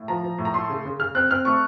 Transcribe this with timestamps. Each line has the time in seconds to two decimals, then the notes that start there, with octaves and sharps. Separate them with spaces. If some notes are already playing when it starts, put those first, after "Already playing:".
Already playing: A2
0.08 F3 A#5
0.23 F3
0.38 A2
0.45 A#5
0.54 A3 C6
0.70 C#3
0.85 C#3
0.99 C#3 F6
1.15 C4 F#6
1.30 C4 F6
1.45 A3 C#6